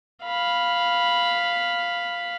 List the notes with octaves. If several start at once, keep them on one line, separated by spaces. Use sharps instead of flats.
F5 B5